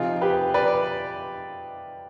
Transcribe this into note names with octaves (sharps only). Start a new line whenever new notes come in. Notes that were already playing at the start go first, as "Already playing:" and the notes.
Already playing: C3 F3 C4 D#4 F4 G#4
G4 B4
B4 D5